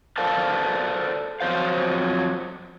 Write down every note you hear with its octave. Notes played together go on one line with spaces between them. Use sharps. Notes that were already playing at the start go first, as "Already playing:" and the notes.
A4 A#4 C5 D5 F5 A5
F2 F#3 C5 F5